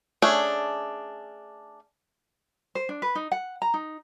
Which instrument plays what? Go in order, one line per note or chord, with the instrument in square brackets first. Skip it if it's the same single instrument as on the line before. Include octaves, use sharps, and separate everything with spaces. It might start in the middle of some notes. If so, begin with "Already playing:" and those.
[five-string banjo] A3 C#4 D4 G#4
[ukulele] C5
D4
B4
D#4
F#5
A#5
D#4